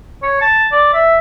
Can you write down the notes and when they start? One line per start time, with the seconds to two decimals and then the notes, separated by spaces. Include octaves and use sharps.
0.23 C#5
0.41 A5
0.72 D5
0.93 E5